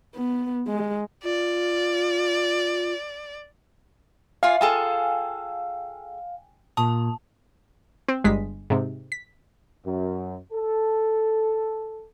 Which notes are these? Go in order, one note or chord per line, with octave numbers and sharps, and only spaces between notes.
B3
G#3
F4 D5
F4 D5 E5 F5 G#5
F4 G#4 A4 G5 G#5
A#2 A5 D#6
C4
G1 G#3 B6
G#2 C3
B6
F#2
A4